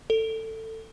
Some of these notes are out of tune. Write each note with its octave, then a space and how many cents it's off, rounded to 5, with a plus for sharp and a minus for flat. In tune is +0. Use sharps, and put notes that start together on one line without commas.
A4 +20